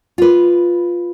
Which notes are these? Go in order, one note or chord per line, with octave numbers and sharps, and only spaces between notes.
F4 B4